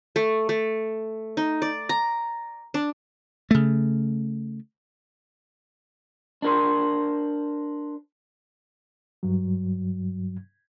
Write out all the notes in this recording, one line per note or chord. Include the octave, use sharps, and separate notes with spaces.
A3
A3
D#4
D5
A#5
D4
C#3 A3
D4 A#4 C5
G2 F#3